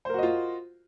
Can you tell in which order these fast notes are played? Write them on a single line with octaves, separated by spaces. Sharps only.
C5 A#4 F#4 D#5 F4